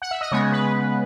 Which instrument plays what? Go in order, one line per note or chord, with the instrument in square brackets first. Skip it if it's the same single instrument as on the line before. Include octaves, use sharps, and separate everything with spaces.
[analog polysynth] F#5
E5
D#5
C#3 G#3 B3 C#5
B4